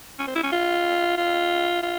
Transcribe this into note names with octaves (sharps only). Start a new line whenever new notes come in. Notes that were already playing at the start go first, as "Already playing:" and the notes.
C#4
C4
E4
C#4
F4
F4
F4